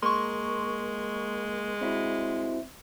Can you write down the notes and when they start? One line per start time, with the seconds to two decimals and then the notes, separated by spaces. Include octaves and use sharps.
0.02 G#3 A#3 C6 C#6
1.81 C4 E4 F#4